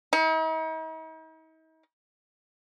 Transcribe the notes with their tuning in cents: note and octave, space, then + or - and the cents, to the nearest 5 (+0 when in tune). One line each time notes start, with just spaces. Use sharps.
D#4 +45